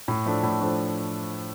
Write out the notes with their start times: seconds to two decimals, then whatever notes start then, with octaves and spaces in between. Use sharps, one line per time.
0.08 A2
0.26 F3 A3 D4
0.43 A2
0.61 F3 A3 D4